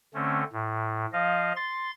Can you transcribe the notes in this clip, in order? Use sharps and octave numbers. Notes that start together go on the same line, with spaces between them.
D3 A3 C4 C#4
A2
F3 D#5 F5
C6 A6